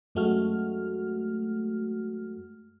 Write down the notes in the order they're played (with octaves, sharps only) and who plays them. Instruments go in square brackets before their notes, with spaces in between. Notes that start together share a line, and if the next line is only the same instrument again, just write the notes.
[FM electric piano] F#2 G#3 A3 F#4 F6